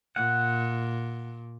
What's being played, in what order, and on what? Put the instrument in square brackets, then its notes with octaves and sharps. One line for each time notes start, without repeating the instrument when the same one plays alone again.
[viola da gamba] A#2 [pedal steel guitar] F#5